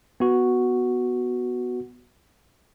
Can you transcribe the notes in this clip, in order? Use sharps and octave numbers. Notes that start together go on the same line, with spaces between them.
B3 F#4